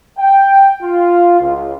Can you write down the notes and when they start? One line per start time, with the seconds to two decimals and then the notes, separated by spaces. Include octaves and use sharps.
0.18 G5
0.82 F4
1.41 C#2